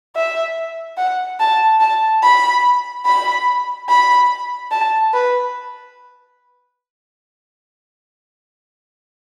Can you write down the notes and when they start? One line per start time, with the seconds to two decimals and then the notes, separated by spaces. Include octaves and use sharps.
0.16 E5
0.97 F#5
1.40 A5
1.80 A5
2.23 B5
3.06 B5
3.89 B5
4.71 A5
5.13 B4